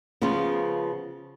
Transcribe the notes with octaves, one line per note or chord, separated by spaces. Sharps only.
C#3 F3 B3 F4